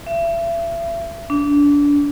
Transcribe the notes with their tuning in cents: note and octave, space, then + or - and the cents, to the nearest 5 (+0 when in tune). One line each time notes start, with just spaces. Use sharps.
E5 +35
D4 -25